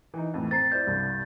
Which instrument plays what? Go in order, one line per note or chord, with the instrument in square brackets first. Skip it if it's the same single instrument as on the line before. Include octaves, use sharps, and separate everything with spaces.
[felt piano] E3 D#4
F2 A2 E3
[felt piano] C4 A#5 C7 [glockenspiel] A6
[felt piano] E4 C5 D5 [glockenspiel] G6
[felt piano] C2 G2